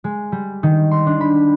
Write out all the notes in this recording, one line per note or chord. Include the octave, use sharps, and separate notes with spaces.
G#3
G3
D#3
C6
D4
B5